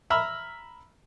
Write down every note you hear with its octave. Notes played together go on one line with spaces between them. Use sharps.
E5 A#5 B5 E6 F6